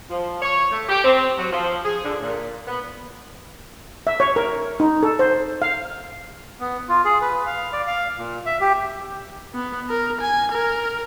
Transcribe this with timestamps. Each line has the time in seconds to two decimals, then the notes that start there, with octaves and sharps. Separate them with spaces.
0.10 F3
0.42 C#5
0.72 A3
0.89 G4
1.05 C4
1.38 F#3
1.53 F3
1.85 G#4
2.05 D3
2.21 A#2
2.68 B3
4.07 E5
4.20 C#5
4.36 A#4
4.80 D#4
5.03 A4
5.19 C5
5.62 F5
6.60 B3
6.89 F4
7.05 G#4
7.21 B4
7.46 F5
7.73 D5
7.87 F5
8.18 A#2
8.46 E5
8.61 G4
9.54 B3
9.90 A#4
10.21 G#5
10.52 A#4